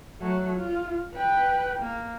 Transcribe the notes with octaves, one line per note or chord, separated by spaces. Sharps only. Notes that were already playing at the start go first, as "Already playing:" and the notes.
F#3 A3
F4
B4 G5
A#3